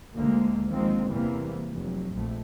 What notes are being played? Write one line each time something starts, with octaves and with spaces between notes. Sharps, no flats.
D2 D3 G#3 A#3
D#3 F3 G#3 A#3 C4
E2 C3 E3 G3 A#3
F1 F#3
A#1 F2 A3